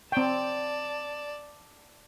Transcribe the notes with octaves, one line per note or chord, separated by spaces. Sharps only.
C4 D5 G5 A5